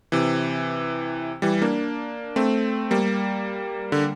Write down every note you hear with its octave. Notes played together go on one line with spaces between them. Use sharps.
C3 E3
E3 G3
A#3 D4
A3 C4
G3 A#3
D3